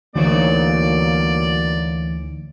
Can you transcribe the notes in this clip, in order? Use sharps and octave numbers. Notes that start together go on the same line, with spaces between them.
D2 G2 E3 F#3 A#3 D#4 C#5 D5